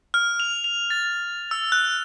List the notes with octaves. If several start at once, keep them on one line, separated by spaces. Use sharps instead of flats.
F6
F7
F7
A6
E6
F#6